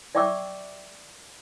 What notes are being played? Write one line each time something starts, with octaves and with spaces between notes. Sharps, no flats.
D5 E5 G5 C#6 D6 E6